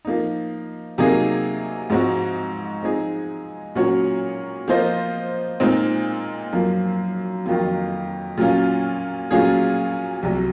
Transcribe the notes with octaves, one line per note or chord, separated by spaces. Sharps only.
F3 A#3 D#4
C3 F#3 A#3 D#4 G#4
G#2 F3 G#3 C4 F#4
F3 G#3 C4 D#4 G#4
A#2 F#3 C#4 F#4 C#5
F3 A#3 F4 C5 D#5
A#2 G#3 C4 D#4
F#2 F3 A#3
F2 D#3 F#3 A#3 F4
A#2 F#3 C#4 F4
A#2 F#3 C#4 F4 G#4
C2 C3 F#3